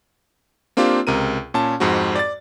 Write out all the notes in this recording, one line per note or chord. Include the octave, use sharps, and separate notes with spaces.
A#3 C4 D4 F4 G4
C#2 C3 A#4 D#7
A#2 C#4 A5
F2 G#2 C4 F#4
D5 A6